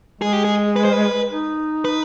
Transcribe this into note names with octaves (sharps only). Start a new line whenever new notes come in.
G#3 G#4
G4
G#4
B4
C5
B4
D#4
B4